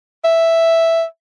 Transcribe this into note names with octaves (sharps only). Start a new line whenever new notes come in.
E5